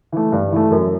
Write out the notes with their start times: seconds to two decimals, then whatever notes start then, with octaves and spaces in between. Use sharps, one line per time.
0.12 E3 A3
0.32 G2
0.52 E3 A3
0.71 F#2